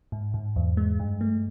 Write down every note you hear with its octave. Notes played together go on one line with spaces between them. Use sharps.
G#2
G#2
E2
G#3
G2
A3